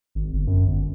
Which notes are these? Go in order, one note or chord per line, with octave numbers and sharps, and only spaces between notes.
G#1
G1
F#2
G1